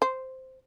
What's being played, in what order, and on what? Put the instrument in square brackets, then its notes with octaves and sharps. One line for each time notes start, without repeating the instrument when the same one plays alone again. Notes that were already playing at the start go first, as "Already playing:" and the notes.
[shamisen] C5